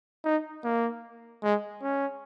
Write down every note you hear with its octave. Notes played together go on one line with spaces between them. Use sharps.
D#4
A#3
G#3
C#4